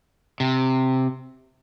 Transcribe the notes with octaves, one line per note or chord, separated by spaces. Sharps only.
C3